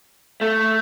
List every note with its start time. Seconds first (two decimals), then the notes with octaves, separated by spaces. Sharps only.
0.41 A3